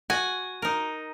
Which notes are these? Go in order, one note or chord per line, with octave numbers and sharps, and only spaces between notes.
F#4 G#5
D#4 A#4